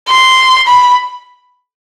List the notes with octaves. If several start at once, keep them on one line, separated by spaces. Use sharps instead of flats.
C6
B5